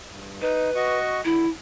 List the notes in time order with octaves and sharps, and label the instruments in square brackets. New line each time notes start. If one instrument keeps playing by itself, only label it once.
[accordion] G2
[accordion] D#4 [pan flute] B4
[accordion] F#4 D#5 C#6
[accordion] D3 [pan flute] E4